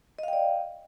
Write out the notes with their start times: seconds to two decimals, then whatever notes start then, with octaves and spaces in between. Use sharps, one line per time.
0.19 D#5
0.23 F5
0.28 G5
0.33 D5